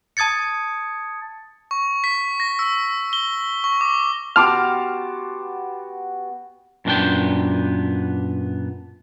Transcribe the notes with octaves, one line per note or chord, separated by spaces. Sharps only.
A5 D#6 G#6 A6 C#7
C#6
B6
A#6
E6
G7
C#6
D6
B3 F#4 G4 A5 C6 D6 F6
F#2 A#2 D3 B3 D4 G5